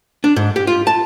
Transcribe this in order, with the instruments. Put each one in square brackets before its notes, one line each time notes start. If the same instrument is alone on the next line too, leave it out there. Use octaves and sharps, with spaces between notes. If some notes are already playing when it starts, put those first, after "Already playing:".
[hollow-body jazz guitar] D4
G#2
G4
F4
A5